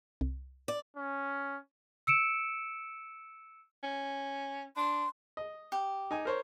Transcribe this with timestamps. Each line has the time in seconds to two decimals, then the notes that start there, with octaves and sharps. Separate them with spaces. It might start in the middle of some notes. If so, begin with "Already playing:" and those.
0.21 C2
0.68 D5
0.97 C#4
2.07 E6 C#7 D7 E7
3.83 C#4
4.77 D4 C6
5.37 D#5
5.72 G4
6.11 D#4 G#5
6.25 A#4 C5 C#5